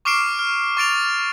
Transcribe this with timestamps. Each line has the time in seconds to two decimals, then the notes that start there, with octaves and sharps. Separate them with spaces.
0.05 C#6 D6 F6 C7 D7 E7
0.39 F6
0.77 C#6 A6 D7 F7